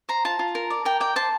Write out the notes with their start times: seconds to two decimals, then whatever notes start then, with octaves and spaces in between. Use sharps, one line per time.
0.09 C5 A#5
0.25 F4 A5
0.39 F4
0.55 A#4
0.70 D5
0.85 A#4 G5
1.00 D5 G5
1.16 C5 A5